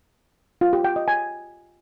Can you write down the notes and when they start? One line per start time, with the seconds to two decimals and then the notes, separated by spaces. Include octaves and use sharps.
0.61 F4
0.73 G4
0.84 G5
0.96 D#5
1.08 G#5